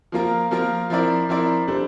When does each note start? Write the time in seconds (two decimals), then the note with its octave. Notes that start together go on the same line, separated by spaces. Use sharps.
0.12 F3 A#3 F4 A#4
0.51 F3 A#3 F4 A#4
0.90 F3 C4 E4 A#4 D5
1.29 F3 C4 E4 A#4 D5
1.68 G3 D4 A4 C5